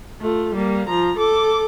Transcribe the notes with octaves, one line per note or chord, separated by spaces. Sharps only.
A3 F4
G3 A#3
F3 A#5
A4 D6